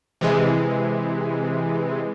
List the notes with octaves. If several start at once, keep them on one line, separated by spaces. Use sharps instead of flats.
C3 E3 G#3